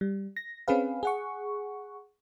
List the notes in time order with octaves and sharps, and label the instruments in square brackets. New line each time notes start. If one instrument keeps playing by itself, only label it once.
[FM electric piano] G3
A#6
C4 C#4 G#4 B4 F5
G#4 F#5 C#6